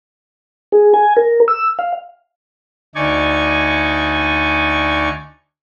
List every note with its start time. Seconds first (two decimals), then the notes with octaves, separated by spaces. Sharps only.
0.72 G#4
0.94 G#5
1.17 A#4
1.48 E6
1.79 F5
2.95 D2 D#4 D5 G#5 C#6